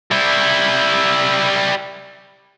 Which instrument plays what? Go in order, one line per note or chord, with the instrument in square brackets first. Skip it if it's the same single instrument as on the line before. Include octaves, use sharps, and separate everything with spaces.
[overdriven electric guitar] G3 E4